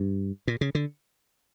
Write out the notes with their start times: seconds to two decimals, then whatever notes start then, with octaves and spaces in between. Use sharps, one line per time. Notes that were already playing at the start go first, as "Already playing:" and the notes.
Already playing: G2
0.48 A#2
0.61 C#3
0.75 D3